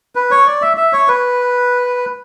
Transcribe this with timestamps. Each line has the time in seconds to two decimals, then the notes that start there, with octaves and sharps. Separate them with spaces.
0.15 B4
0.31 C#5
0.46 D5
0.62 E5
0.77 E5
0.93 C#5
1.08 B4